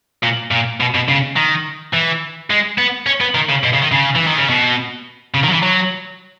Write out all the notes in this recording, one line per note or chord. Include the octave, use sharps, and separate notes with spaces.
A#2
A#2
B2
B2
C#3
D#3
E3
G#3
B3
C#4
B3
D#3
C#3
B2
C#3
D#3
C#3
E3
D#3
C#3
B2
C#3
D#3
F#3
E3
F#3